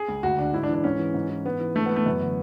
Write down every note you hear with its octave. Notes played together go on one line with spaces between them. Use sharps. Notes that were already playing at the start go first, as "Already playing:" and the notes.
Already playing: G#4
C#2
D2 F#4
D3 D4
G#2 E4
D4
E3
D4
G#2 C#4
E3
G#2
E3
G#2 B3
E3
G#2 A3
B3
E3 A3
F#2 B3
D3